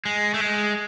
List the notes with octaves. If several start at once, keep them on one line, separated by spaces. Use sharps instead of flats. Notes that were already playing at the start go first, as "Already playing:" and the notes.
G#3
A3
G#3